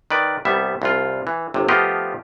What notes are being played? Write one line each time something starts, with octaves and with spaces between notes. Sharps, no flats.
D#3 B4 D5
C2 G3 B3 E5
C2 F4
E3
G1 C3
F3 A3 B3 F4 G4 D#5